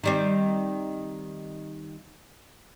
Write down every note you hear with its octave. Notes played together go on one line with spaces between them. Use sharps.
D#3 G3 C4